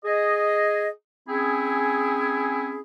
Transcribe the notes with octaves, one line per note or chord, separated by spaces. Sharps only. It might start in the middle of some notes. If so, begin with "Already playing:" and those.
G#4 D#5
C4 C#4 E4 G#4